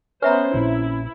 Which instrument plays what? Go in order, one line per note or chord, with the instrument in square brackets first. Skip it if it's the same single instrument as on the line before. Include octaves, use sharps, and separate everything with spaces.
[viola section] B3 C5 [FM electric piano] C#4 [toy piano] B4 E5 A#5
[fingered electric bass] A#1 A#2 C4 [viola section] E4